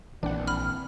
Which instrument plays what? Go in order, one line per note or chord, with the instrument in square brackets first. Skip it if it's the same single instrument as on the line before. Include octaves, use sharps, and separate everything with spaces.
[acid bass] A#1 [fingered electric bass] E3 A#3 C4 [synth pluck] D4 F#5
[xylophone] B5 F6